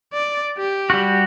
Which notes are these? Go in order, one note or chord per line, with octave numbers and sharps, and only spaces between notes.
D5
G4
G3 F#4